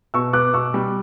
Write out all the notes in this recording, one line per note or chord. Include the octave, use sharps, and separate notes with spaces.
B2 C#6 E6
B3 D6 F#6
B2 C#6 E6
G3